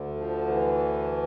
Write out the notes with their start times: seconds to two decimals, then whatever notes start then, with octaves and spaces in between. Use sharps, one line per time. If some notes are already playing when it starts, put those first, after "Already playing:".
Already playing: D2 D3
0.16 F3
0.48 E3